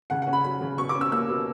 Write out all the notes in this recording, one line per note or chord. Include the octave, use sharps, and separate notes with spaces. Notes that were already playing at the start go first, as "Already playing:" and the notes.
C#3 F#5
C#4 F#5
B5
F#3 B5
C#3
B2 C#6
D6
C#4
E6
A#3 E6
B2